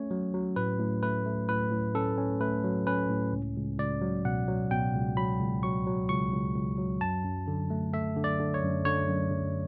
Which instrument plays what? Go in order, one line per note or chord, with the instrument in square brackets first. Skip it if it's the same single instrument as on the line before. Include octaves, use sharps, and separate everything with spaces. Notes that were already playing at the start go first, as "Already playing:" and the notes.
Already playing: [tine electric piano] A3 C#4 C#5
F#3
F#3
A2 B4
A2
A3 B4
A3
A2 B4
A2
C#4 A4
C#4
A3 B4
F#3
C#4 B4
A2
C#2
C#2
C#2 D5
F#3
B2 F#5
F#3
B2 G5
C#2
F#3 B5
C#2
F#3 C#6
F#3
C#2 C#6
C#2
C#2
F#3
F#2 A5
F#2
D3
A3
A3 E5
D3
D5
D3
C#5
F#2
D3 C#5
F#2
F#2